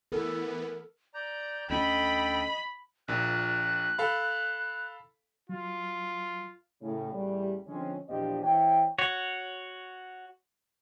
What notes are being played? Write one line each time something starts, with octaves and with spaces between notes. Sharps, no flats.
E3 B3 A4 A#4
D5 A#5 G6
D2 C#4 A4 D#5 G5 B5
A#1 A#2 F#6
A4 F5 B5
F#3 F4
A2 C#3
A1 E2 G3
D3 F3 G#3 C4 C#4
A#1 E2 F3 D4 G4 D#5
E3 C5 C#5 E5 G5
F#4 C#5